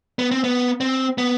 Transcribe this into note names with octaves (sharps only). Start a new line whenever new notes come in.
B3
C4
B3
C4
B3